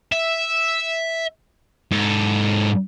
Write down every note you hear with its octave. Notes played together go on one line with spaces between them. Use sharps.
E5
G#2 A4